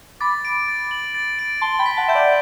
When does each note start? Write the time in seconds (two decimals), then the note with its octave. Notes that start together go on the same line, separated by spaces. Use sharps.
0.20 B5 D6 A6
0.45 D7
0.68 A6
0.91 F#7
1.15 A6
1.39 D7
1.61 A5 C6 G7
1.79 G5 B5
1.86 B6
1.97 F#5 A5
2.08 E5 G6
2.15 D5 F#5